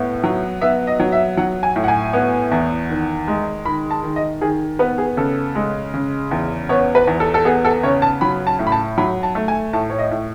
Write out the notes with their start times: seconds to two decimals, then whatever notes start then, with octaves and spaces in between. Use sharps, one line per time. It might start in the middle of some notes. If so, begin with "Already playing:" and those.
Already playing: A2 B3
0.24 F#3
0.61 B3 E5
0.87 D#5
1.00 F#3
1.12 E5
1.37 F#3 F#5
1.63 G#5
1.76 A2
1.84 F#5
1.88 G#5
2.13 B3
2.51 E2
2.90 D#3
3.28 G#3
3.65 D#3 B5
3.91 A5
4.04 D#3
4.16 D#5
4.41 D#3 G#4
4.79 B3 B4
4.98 G#4
5.17 C#3 A4
5.55 G#3
5.94 C#3
6.31 E2
6.69 B3 C#5
6.95 B4
7.07 E2
7.20 A4
7.34 A4
7.45 B3 G#4
7.65 A4
7.83 C#3 C#5
8.02 A5
8.21 F#3 B5
8.47 A5
8.59 A2
8.67 B5
8.72 A5
8.98 F#3 B5
9.23 A5
9.35 A3
9.48 G#5
9.73 A2 A5
9.90 C#5
9.99 D#5
10.11 A2